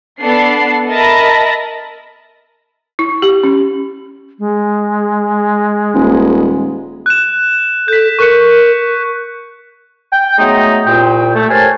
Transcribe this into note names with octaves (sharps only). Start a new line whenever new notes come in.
B3 D4 A4 C7
A#4 D#5 E5 A5 B5 A#6
E4
G4
C#4
G#3
D#1
F#6 E7
A4 G6 B6
A#4 C#6 F#6 C#7
G5
F#3 G#3 A3 B3 D#4
C2 A#2 G5
A3
G4 A#4 C5 C#5 G#5 A5